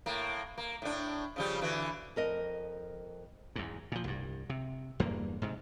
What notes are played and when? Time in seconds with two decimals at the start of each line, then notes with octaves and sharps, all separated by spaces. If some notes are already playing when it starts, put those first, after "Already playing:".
0.06 A2 A#3
0.58 A#3
0.82 A2 D4
1.36 C#3 F3 G3
1.61 D3 E3 F#4
2.16 F2 A#4 D#5
3.56 E2 G#2
3.92 A#2 F3
4.04 C2 G2
4.50 C3
5.00 E2 G2 A#3
5.42 G#2 C3